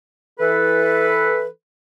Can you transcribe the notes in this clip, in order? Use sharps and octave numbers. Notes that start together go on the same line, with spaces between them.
E3 A4 B4